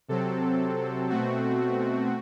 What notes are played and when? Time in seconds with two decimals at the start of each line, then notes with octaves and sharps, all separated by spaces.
0.08 C3 F#3 C4 A4
1.09 B2 A3 C4 F#4